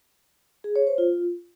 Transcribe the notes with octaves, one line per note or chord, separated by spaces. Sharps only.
G#4
C#5
C5
F4